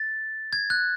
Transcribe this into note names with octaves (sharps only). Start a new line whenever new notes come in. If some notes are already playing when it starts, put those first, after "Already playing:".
Already playing: A6
G#6
F#6